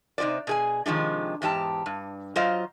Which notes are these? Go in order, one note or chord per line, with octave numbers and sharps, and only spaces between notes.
C3 D#4 F#4 C5 D5
B2 G#4 G#5
C3 D#3 F3 G#3 D4
E2 G#2 G4 A5
G2
F#3 F4 C5 D#5 F5